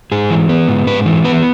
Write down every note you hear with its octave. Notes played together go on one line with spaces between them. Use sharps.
G#2 G#4
E3
B3
G#2
G#2 B4
E3
B3 B4